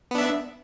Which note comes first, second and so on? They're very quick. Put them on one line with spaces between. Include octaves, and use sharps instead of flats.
B3 D4 E5